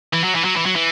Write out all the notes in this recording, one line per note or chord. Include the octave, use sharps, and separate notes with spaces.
E3
F#3
E3
F#3
E3
F#3
E3